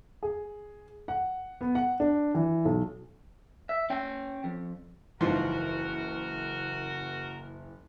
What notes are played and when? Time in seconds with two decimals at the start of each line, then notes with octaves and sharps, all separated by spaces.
0.23 G#4
1.08 F#5
1.61 B3
1.75 F#5
2.00 D4
2.34 E3
2.65 B1
3.69 E5
3.90 C#4 G5
4.44 F2
5.21 F#1 G#2 E3 F3 F#4 A#4 C6